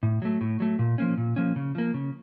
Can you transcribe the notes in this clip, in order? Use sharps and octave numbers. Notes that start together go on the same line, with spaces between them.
A2
F#3 A3
A2
F#3 A3
A#2
F3 A#3 C#4
A#2
F3 A#3 C#4
C#3
F3 A#3
C#3